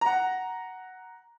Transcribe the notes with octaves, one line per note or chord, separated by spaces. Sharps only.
F#5 A#5